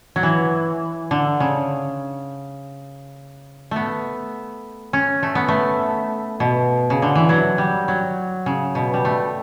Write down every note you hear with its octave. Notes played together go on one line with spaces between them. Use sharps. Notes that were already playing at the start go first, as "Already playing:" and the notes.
F#3
E3
D3
C#3
A3 B3
C#4
A3
B3
A3
B2
C#3
D3
E3
F#3
G3
F#3
C#3
B2
G3
A3